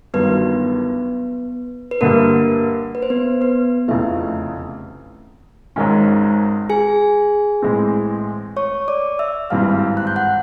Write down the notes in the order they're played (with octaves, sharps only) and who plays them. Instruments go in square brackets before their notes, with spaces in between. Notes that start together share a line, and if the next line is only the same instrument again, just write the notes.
[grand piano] G1 G2 D#3 F#3 [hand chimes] B3 B4
[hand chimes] B4
[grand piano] G2 D3 G3 [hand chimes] A#3 A#4
[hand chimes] B4
C5
B3 B4
B3 B4
[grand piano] F1 E2 C#3 F3 A3 [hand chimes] E4 E5
[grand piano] G#1 G#2 D#3 G#3 C#4
[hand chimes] G#4 G#5
[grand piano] A2 E3 G#3 C4
[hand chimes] C#5 C#6
D5 D6
E5 E6
[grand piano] G#1 G2 E3 G3 C4 [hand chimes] F5 F6
[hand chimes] F#6
G6
F#5 F#6